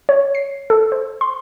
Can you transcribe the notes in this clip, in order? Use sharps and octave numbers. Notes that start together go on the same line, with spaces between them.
C#5
C7
A4
C5
C6